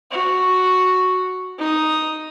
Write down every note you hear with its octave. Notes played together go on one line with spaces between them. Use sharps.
F#4
D#4 D#6